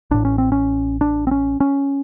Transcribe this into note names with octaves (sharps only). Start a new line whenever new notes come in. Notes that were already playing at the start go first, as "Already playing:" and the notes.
A1 A2 D4
C#4
C4
C#4
D4
C4
C#4
C#4